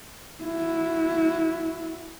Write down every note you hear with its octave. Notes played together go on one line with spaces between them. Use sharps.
E4 F#4